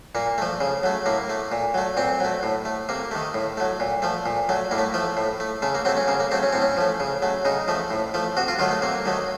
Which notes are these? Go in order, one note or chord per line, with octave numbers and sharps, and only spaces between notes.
A#2 A#3
F3 A3
C#3
F#3 A3
A2 A#3
A3
A#2
F#3 A3
A#2 C4
F#3 A3
A2
A3
C3 A#3
D#3 A3
A2
F#3 A3
A#2
F3 A3
A#2
F#3 A3
A2 A#3
A3
F3 A3
A2
A3
C#3 A3
A#3
F#3 A3 C4
C#4
C#3 A#3
A#3
F#3 A3 C4
C#4
A2 C4
C#4
F3 A3
C#3
F#3 A3
C#3 D#4
F3 A3
A2
F3 A3
C3 F#4
F4
D#3 F#3 A3 F4
A3
C3 A#3
D#3 F#3 A3